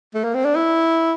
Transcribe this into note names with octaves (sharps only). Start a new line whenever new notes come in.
A3
A#3
C4
D4
E4